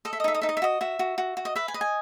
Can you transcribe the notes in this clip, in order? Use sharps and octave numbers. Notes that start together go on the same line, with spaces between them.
A4 D#5
E5
D#5
D#4 E5
D#5
D#4 E5
D#5
E5
F#4 D#5
F#4 E5
F#4
F#4
F#4
D#5
B4 E5
G#5
D#5
G#5